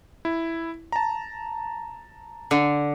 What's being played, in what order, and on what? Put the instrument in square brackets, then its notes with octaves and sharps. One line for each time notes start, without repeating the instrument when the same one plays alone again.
[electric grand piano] E4
A5 A#5
[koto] D3